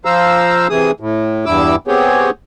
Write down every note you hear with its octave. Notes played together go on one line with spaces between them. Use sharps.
F3 C5 F5 A#5 E6
C3 E3 G#4 D#6
A2
E2 G2 E4 D6 E6
B3 C4 G4 G#4 C#5